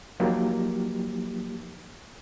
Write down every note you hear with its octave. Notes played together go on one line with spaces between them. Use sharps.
F3 F#3 A#3 D#4 G4